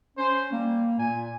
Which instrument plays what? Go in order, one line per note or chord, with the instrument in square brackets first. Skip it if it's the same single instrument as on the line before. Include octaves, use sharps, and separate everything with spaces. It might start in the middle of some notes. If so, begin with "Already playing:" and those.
[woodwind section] C#4 [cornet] C5
[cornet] G3 [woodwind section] A#3
[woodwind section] A#2 [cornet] G#5